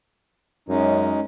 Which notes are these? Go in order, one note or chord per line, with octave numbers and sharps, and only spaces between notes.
F#2 G#3 C#4 D#4